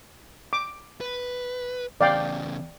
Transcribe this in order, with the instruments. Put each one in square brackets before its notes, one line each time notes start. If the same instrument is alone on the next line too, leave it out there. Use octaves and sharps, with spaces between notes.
[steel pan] D6
[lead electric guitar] B4
[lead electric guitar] E2 C#3 [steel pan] D5 F5 G5